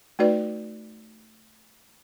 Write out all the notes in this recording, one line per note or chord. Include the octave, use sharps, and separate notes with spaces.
A3 D#4 F#4 B4 D5